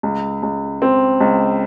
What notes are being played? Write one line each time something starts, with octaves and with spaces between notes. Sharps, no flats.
C#2
C#2
C4
C#2